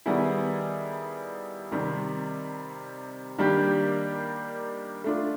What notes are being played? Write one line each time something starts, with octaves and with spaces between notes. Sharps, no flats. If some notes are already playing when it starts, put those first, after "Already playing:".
D#3 G3 B3 E4 G#4
C3 D#3 G3 C4
D#3 G3 A#3 D4 G4
A3 D4 F4